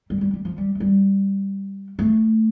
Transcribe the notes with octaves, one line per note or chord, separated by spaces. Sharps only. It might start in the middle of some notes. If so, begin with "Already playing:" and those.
G3
G3
G3
F3
G3
A3
G3
A3